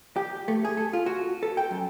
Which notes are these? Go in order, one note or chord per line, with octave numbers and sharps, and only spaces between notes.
G4
A3
G#4
A4
F4
F#4
A4
G5
F#2